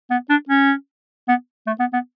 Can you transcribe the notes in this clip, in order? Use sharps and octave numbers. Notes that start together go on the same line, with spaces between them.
B3
D4
C#4
B3
A3
B3
B3